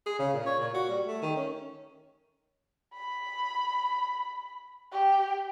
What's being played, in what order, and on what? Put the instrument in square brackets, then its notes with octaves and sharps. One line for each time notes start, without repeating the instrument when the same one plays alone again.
[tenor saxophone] G#4
C#3
A#2
C#5
A#2
F#4
G3
A3
D#3
C#4
[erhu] B5
G4